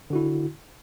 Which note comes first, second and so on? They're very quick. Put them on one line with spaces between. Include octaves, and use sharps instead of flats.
D3 F#4 E4